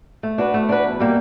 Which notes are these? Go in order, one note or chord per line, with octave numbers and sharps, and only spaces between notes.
A3
D4 F#4 B4
A3
D4 F#4 B4
E2
B2 G3 A#3